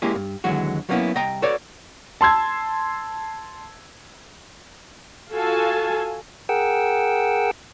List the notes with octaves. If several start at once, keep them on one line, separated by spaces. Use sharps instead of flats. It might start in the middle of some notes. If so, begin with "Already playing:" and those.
G#3 A#3 C#4 E4 G4 G#4
G2
D#2 D3 E3 F#3 G#3 F#4
F#3 G3 A#3 B3 C#4 E4
C2 D#5 G5 A#5
F#4 A4 B4 C#5 D5
A5 C6 E6 G#6
F4 F#4 A4 F5 G#5 A5
G#4 A#4 F#5 G5 E6